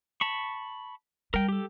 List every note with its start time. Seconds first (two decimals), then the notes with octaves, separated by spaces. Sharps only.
0.21 A5 B5 C#6
1.34 G3 A#4 G5
1.48 G4 A4